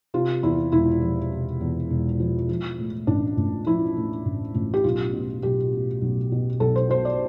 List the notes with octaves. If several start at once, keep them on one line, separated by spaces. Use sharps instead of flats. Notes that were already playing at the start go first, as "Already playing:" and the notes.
C3 F4
E2 E4
E1 E4
F3
C3
E2
E1
F3
F3
A2
A1 D4
A1
F3 E4
A2
A1
A1
G4
B1 F4
B2
B1 G4
B2
B1
B2
B1 A4
C5
B2 C5
D5